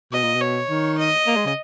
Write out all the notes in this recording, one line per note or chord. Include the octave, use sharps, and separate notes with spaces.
B2 D#5
A#2
B2
C#5
D#3
D#5
A#3
G#3
C#3